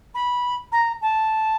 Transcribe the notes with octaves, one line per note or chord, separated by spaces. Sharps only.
B5
A#5
A5